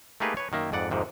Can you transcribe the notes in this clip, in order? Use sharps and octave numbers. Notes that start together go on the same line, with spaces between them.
A3 A#3 D#4 G4 G#4 B4
B4 C#5
F#2 D#3 A#3 E5
F2 G#2 D5 F#5
F2 G#2 C3 D#3